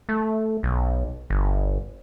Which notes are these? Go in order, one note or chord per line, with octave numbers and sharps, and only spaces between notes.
A3
B1
G1